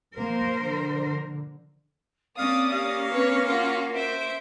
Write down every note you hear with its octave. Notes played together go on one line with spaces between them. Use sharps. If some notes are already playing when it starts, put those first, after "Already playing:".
F3 A#3 A#4 C5
D3
A#3 C4 C#4 D5 F5 D#6
G4 F5
C4 B4 C#5
F4 F#4 A#4
C5 E5 D7